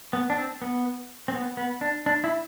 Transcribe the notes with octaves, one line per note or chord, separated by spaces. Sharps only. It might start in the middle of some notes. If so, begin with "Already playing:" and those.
B3
D4
C4
B3
C4
B3
B3
D4
D4
E4